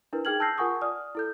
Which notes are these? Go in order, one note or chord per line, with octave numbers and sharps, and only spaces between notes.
D4 E4 A#4 B4
D#4 G#4 G5 F6 G#6 F#7
A5 E6 G6 A#6 C7
F4 A#4 F#5 G#5 C#6 D#6
D5 D#6 F6
E4 A4 G6